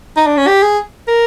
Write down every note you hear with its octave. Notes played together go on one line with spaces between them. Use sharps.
D#4
D4
C#4
G4
G#4
A#4